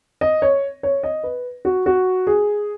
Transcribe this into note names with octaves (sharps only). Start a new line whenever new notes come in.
D#5
C#5
C#5
D#5
B4
F#4
F#4
G#4